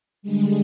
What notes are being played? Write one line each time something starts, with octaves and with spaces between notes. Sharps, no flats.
D3 G3 G#3